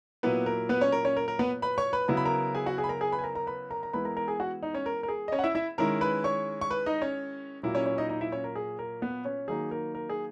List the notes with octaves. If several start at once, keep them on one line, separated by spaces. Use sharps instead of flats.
A#2 F#3 A#3 B3 E4 B4
A#4
B3 B4
C#4 C#5
A#4
C#4 C#5
A#4
A#4
B3 B4
B4 B5
C#5 C#6
B4 B5
C#3 F#3 B3 E4 A#5
B5
A#4 A#5
G#4 G#5
F#4 F#5
G#4 G#5
B5
A#4 A#5
G#4 G#5
B4 B5
G#5
A#4 A#5
A#4 A#5
B4 B5
A#4 A#5
A#5
E3 G#3 B3 E4 B4 B5
A#4 A#5
A#4 A#5
G#4 G#5
F#4 F#5
D#4 D#5
C#4 C#5
A#4
A#4
G#4
D#5
C#4 C#5
F#5
E4 E5
E4 E5
D#3 G#3 C#4 E4 A#4 A#5
B4 B5
C#5 C#6
C#6
B4 B5
D#4 D#5
C#4 C#5
A#2 F#3 A#3 E4
C#4 C#5
C#4 C#5
D#4 D#5
D#4 D#5
E4 E5
C#4 C#5
A#4
G#4
A#4
B3 B4
C#4 C#5
D#3 F#3 A#3 D#4 G#4
A#4
A#4
G#4